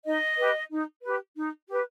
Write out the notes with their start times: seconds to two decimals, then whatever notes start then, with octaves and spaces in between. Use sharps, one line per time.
0.05 D#4 D#5
0.38 G4 B4
0.71 D#4
1.03 G4 B4
1.36 D#4
1.68 G4 B4